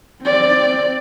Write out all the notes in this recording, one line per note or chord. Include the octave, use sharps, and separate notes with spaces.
C4 D5